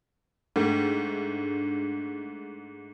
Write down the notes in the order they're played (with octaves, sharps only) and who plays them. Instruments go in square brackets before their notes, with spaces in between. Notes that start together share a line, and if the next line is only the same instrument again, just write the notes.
[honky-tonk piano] G#2 A3 [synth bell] D4